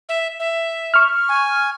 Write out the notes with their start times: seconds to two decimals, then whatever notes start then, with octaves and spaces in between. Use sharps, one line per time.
0.09 E5
0.40 E5
0.94 C#6 F6
1.29 G#5